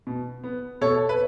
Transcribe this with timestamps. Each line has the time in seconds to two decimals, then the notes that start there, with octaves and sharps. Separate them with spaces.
0.07 B2
0.44 B3
0.81 B2 A4 C#5
1.09 B4